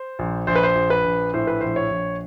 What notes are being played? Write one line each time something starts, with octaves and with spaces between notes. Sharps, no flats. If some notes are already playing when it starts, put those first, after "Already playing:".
Already playing: C5
A#1
A#1 C5
B4
C5
A#1
B4
A#1
A2 C5
B4
A#1 C5
C#5
A#1